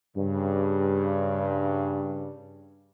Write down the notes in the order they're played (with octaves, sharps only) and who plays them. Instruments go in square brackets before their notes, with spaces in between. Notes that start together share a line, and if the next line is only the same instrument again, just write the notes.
[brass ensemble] G2 C#3